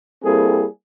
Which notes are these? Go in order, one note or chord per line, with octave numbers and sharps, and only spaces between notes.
G3 A#3 C4 E4 G#4 A4